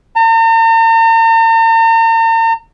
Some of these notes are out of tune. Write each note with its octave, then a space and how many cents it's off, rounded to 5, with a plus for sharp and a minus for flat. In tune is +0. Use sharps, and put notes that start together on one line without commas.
A#5 -45